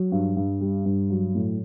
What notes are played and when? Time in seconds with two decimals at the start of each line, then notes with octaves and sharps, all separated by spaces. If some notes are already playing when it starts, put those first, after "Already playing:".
Already playing: F#3
0.12 G2
0.37 G2
0.61 G3
0.86 G2
1.10 F#3
1.35 A2